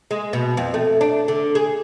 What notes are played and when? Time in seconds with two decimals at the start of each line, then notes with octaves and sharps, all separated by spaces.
0.11 G#3
0.33 B2
0.57 F2
0.74 A3
1.01 D4
1.28 D3
1.55 G#4